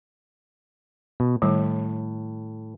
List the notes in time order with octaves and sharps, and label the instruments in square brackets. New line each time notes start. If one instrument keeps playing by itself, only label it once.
[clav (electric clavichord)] B2
[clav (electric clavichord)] A2 [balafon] D#3 G3